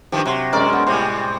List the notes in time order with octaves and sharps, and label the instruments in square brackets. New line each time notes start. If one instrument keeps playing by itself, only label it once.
[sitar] G2 D#3 F3 [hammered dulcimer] G4
[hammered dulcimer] C3 C5 [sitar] F#3
[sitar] F#2 D5 [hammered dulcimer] G#3 C#4 A#4
[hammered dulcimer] B3
[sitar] A2 C3 G3 [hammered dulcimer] C5